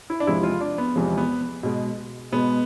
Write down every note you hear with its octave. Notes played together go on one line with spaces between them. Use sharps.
E4
D4
E2 C3 F3 G#3 E4
F4
D4
B3
E2 C3 F3 G#3
B3
B2 G#3
B2 G#3 B3